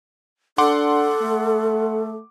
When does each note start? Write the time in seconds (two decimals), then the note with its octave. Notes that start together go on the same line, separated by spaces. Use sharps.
0.58 D4 A4 F#5 C6 D6
1.22 A3